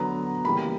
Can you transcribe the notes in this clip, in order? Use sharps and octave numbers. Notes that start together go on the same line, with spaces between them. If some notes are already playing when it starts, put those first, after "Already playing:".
Already playing: D3 F#3 B3 A#5
C#3 E3 G3 A#3 B5